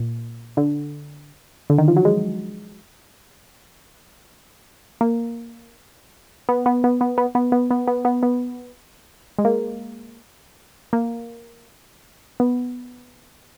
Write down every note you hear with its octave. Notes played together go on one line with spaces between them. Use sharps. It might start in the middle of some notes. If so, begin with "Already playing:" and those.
Already playing: A#2
D3
D3
D#3
F3
F#3
G#3
A#3
B3
B3
B3
B3
B3
B3
B3
B3
B3
B3
B3
G#3
A#3
A#3
B3